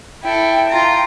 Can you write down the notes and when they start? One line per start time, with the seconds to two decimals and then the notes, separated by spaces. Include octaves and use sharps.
0.23 E4 A4 G5
0.69 F4 A#5